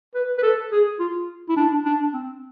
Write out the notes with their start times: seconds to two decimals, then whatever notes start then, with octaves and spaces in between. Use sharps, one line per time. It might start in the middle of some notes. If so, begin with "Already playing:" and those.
0.15 B4
0.38 B4
0.43 A4
0.72 G#4
0.99 F4
1.49 E4
1.56 D4
1.85 D4
2.14 C4